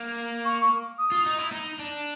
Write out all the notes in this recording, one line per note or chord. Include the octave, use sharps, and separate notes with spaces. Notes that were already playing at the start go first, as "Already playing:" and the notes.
Already playing: A#3
C#6
D#6
F4
D#4
E4
D#4
D4